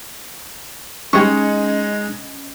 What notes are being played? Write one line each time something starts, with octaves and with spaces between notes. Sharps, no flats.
G3 G#3 C#4 D#4 D#5 C#6 G#6